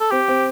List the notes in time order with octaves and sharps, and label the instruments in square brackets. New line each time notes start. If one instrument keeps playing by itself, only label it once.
[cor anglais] A4
[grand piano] C4 [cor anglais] G4
[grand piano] C4